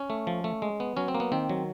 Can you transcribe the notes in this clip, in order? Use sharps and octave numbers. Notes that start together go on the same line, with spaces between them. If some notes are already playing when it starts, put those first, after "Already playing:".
Already playing: C#4
A3
F3
A3
G#3
B3
F#3 C#4
C4
A#3
B3
D#3 C4
F#3